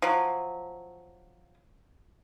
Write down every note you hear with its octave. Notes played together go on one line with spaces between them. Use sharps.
F3 F#3